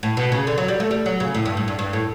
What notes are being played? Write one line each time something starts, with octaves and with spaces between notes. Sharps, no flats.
A2
B2
C#3
D3
F#3
G3
A3
G3
F#3
C#3
A2
G2
A2
G2
G2
A2